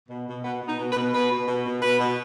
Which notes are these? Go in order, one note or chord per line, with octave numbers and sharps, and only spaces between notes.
B2
B2
B2 B3
B2
D#4
B2
B4
B2
B2 B4
B2
B2
B2
B2 B4
B2